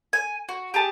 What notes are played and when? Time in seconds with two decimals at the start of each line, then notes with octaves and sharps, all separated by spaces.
0.13 G#5
0.49 F#4
0.74 G4 G#4 A5